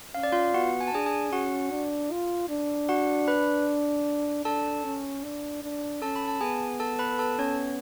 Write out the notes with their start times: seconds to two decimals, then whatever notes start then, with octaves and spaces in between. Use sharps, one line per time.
0.14 C#4 F5
0.23 D5
0.32 F4 F5
0.54 B3 F#4 F#5
0.81 G#5
0.88 A5
0.93 D4 G#4 G#5
1.06 G#4 G#5
1.32 C#4 F#4 F#5
1.71 D4
2.11 F4
2.49 D4
2.89 F#4 F#5
3.28 B4 B5
4.45 D4 A4 A5
4.84 C#4
5.24 D4
5.63 D4
6.02 C#4 A4 A5
6.16 B5
6.28 A5
6.41 B3 G#4 G#5
6.80 A4 A5
6.99 B4 B5
7.19 A4 A5
7.39 C#4 C#5